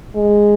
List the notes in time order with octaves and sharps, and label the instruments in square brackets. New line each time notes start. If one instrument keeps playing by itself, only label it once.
[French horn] G#3